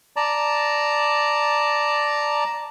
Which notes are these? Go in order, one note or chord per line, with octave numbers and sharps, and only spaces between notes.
D5 A5 A#5